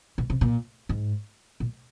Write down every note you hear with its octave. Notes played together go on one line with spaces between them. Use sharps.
A#2
C3
A#2
G#2
A#2